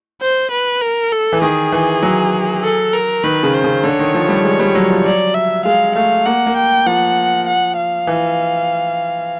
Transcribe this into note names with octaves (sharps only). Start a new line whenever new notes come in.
C5
B4
A#4
A4
E3
D#3 G#4
E3
F#3
A4
A#4
D#3 B4
C#3
C5
C#3
D3 C#5
D#3
F3
G3
G#3
G3
F#3
F3
F#3 D5
E5
G#3 F5
A3 F5
A#3 F#5
A#3
G5
F3 F#5
F#5
F5
E3